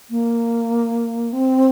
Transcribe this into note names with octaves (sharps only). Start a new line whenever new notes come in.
A#3
C4